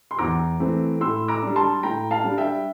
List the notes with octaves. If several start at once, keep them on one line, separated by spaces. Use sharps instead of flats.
C6
E2 A#5 D6
E3 A3 C4
A2 C6 E6
A#5 D6
G3 D4
A5 C6
A2 G5 A#5
F5 A5
G3 D4
E5 G5